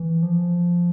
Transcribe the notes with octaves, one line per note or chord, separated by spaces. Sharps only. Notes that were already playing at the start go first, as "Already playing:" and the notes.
Already playing: E3
F3